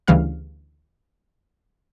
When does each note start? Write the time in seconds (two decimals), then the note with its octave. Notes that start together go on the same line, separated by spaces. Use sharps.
0.08 D2 C#3 E3 G3 F5 F6